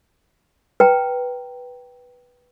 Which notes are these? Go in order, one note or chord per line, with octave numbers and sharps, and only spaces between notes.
B4 G5 A#5